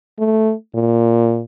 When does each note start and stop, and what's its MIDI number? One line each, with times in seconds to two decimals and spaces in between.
0.19 0.53 57
0.75 1.42 46